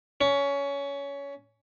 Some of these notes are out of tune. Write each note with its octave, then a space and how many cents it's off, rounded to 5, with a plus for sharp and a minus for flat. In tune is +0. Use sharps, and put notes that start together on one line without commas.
C#4 +20